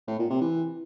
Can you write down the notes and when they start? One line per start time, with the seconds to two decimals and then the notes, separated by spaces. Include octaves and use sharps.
0.08 A2
0.19 A#2
0.30 C3
0.41 E3